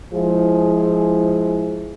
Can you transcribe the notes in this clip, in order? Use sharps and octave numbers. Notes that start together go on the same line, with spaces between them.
F3 G#3 E4 G#4